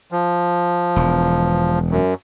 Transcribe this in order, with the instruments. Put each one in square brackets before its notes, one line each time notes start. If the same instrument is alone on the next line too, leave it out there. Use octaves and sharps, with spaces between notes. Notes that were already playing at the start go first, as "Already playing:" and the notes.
[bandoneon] F3
[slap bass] E1
[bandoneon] F#2